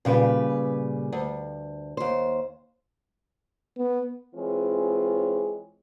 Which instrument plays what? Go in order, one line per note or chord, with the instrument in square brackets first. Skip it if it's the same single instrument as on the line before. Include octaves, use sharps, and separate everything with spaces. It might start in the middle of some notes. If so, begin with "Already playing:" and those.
[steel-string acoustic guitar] A#2 C#3 G3 B4
D2
D#2 C5
[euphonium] B3
[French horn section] E3 G#3 C4 F4 G#4 C#5